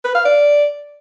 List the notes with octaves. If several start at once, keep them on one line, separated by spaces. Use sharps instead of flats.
B4
F5
D5